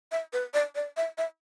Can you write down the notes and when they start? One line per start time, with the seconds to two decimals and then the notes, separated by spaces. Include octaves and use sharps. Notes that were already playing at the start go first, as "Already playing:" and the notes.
0.12 E5
0.33 B4
0.54 D5
0.75 D5
0.97 E5
1.18 E5